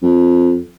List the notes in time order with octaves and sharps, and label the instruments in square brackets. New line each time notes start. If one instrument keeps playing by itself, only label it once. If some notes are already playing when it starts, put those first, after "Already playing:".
[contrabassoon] F2